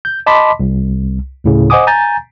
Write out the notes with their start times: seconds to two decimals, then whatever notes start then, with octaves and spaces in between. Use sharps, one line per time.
0.05 G6
0.26 D#5 A5 B5 C6 D6 B6
0.60 C2
1.44 D2 A2 C#3
1.70 C5 D#5 F#5 G#5 D6 D#6
1.87 G#5 A#5 G6 A6